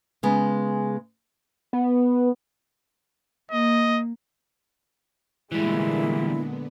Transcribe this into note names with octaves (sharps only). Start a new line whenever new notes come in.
C#3 G#3 B3
B3
A#3 D#5
A#2 D3 E3 G3 G#3 B3 E4